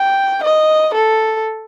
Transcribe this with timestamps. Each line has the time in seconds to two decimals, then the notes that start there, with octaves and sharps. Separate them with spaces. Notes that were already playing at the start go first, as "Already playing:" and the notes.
Already playing: G5
0.44 D#5
0.95 A4